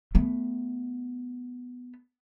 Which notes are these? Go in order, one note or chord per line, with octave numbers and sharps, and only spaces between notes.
A3 B3